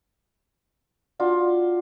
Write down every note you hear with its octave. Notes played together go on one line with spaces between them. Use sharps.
D4 F4 F#4